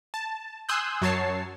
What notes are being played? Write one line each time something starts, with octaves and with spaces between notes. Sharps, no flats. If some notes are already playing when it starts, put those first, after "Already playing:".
A5
G#5 C6 D#6 E6 F#6 G6
F#2 F#3 C#5 A5 C7